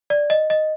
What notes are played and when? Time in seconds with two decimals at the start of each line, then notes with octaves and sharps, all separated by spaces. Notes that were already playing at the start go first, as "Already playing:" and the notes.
0.10 D5
0.30 D#5
0.50 D#5